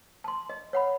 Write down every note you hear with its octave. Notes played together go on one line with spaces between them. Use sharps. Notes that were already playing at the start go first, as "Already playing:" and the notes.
A5 C6
D#5
C#5 F#5 B5